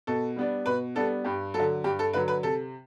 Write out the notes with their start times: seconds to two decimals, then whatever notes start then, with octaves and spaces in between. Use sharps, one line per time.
0.07 B2 A4
0.36 G3 B3 D4
0.66 B2 B4
0.95 G3 B3 D4 A4
1.24 G2 G4
1.54 F#3 A4
1.60 D3
1.84 G2 G4
1.99 A4
2.13 D3 F#3 B4
2.28 B4
2.43 C3 A4